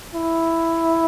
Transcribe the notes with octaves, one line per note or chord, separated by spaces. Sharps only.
E4